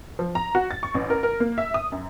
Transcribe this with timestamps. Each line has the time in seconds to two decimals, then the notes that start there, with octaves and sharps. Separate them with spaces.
0.19 F3
0.35 A#5
0.55 F#4
0.71 A6
0.83 C#6
0.94 A1
1.10 A#4
1.23 A#4
1.40 A#3
1.58 E5
1.74 D#6
1.92 F#2